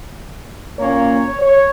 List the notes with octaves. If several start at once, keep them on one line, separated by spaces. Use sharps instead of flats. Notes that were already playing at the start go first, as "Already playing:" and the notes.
A#2 A#3 C#4 C#5
C#5